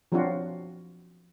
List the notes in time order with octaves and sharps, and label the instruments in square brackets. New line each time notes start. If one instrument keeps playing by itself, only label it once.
[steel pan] F3 F#3 C4 D4 F4 F#4